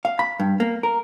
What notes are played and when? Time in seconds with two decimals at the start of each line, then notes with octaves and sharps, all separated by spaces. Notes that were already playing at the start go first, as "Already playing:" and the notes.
0.05 F5
0.19 B5
0.40 G2
0.60 A#3
0.83 A#4